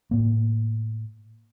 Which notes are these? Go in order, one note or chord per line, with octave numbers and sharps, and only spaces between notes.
A2 A#3